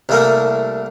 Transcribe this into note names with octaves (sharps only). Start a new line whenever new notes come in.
C2 A3 A#3